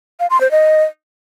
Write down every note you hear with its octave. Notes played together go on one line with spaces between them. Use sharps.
F5
C6
C5
D#5